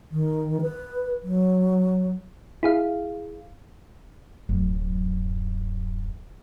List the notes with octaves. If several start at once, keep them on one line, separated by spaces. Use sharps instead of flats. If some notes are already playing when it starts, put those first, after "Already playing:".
D#3
B4
F#3
E4 G#4 F5
D1 F#2